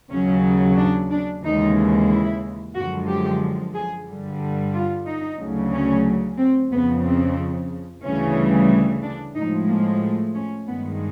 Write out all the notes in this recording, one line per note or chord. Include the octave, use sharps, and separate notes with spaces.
D#2 C#3 F#3 C#4
D4
D4
D#2 C#3 E3 G#3 D#4
E4
F#2 D3 F3 G#3 F#4
G4
G#4
G2 D3 G3
F4
D#4
D2 C#3 F#3
C#4
C4
F2 C#3 F3 B3
C4
D2 C#3 E3 G3 C#4
D4
A2 F3 G#3 D#4
A#3
A3
C#4
G2 D#3 G#3 B3